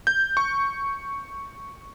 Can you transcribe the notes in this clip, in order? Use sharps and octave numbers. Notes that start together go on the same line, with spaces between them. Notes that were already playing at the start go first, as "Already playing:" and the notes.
G6
C#6